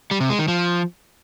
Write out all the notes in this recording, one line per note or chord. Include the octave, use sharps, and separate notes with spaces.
G3
C3
G#3
D#3
F3